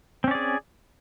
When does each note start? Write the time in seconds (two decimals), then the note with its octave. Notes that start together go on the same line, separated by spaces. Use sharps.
0.24 C4
0.28 C#4
0.31 D5
0.35 G#4